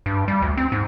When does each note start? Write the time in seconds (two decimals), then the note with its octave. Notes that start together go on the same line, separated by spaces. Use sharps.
0.06 G2
0.28 G3
0.42 D2
0.57 C4
0.72 G#2